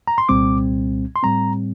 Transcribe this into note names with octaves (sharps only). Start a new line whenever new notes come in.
A#5
C6
C2 A#2 G3 C4 D6
C6
A2 G3 C4 A#5